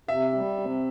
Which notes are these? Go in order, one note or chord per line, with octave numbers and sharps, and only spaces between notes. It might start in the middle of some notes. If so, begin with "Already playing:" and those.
C3 E5
G3
C3